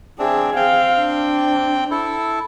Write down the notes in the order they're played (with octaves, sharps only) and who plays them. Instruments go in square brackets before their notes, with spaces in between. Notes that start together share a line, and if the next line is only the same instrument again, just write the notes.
[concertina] C4 D4 [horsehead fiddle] G#4 E5
[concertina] C4 G5 [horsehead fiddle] F5
[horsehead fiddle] D4
[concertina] E4 A4